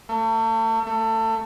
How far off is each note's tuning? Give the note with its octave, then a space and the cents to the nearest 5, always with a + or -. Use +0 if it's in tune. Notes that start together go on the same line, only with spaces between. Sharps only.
A3 +35
A3 +25